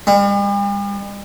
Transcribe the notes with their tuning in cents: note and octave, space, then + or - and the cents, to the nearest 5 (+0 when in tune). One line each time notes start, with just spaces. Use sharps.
G3 +45